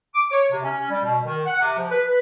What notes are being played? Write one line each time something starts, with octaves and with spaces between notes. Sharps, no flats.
D6
C#5
C3
C#4
G3
B2
D#3
F#5
C3
F3
B4
B4